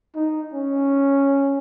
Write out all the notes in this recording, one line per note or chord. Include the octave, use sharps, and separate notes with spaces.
D#4
C#4